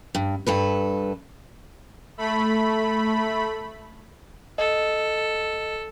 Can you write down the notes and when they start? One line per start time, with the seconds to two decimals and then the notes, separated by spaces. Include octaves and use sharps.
0.15 G2
0.47 G2 A4 B4
2.18 A3 B5
4.58 A4 D#5